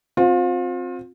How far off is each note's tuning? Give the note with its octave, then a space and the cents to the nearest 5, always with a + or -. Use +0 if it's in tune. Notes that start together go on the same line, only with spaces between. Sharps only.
C4 +10 F4 +35